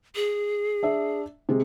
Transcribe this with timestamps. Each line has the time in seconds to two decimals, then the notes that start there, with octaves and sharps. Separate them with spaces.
0.16 G#4
0.83 D4 E5
1.49 C3 G#3